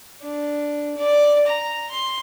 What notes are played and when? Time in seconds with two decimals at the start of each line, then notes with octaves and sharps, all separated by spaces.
0.21 D4
0.97 D5
1.47 A#5
1.90 C6